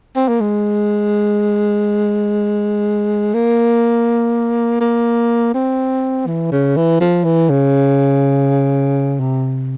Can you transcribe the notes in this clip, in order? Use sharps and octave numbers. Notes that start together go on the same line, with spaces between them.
C4
A#3
G#3
A#3
A#3
C4
E3
C#3
E3
F3
E3
C#3
C3